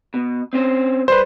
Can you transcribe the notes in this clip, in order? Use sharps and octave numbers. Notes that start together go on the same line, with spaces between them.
B2
C4 C#4 C5
G3 B4 C5